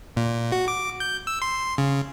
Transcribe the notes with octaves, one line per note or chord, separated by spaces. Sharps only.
A#2
F#4
D6
G6
E6
C6
C#3